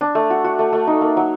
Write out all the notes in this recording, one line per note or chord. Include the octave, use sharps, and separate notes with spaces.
D4
A3
F#4
F#4
A3
A3
D#4
A#3
F#3